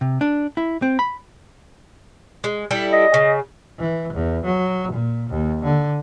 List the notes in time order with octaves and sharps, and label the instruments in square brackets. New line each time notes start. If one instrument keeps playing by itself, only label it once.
[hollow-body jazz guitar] C3
D4
E4
C4
B5
[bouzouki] G#3
G3 E4 A4
[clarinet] D#5
[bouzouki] C#3
[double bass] E3
E2
F#3
A#2
D#2
D3